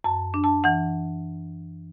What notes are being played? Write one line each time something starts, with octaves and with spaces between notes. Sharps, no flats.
F#2 A5
D4
A5
E3 F#5